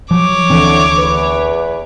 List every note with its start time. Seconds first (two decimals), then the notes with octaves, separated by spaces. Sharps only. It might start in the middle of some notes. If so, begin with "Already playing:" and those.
0.11 F3 F#3 C#5 D6
0.50 D2 A2 D3 E3 C4
0.99 E2 B4